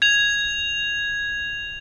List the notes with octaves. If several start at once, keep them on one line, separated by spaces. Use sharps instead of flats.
G#6 F7